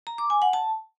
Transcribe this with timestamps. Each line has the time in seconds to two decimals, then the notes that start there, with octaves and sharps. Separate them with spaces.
0.07 A#5
0.18 D6
0.30 G#5
0.42 F#5
0.53 A5